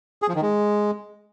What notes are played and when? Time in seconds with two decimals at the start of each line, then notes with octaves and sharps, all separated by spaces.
0.22 G#4
0.29 F3
0.35 D#3
0.42 G#3